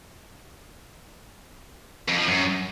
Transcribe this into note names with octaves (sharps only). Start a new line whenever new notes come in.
F2
F3
F#2